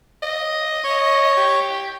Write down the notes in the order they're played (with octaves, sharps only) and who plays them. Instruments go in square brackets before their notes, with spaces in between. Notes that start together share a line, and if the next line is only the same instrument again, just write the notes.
[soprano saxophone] D#5
[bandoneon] C#5 C#6
[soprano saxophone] G4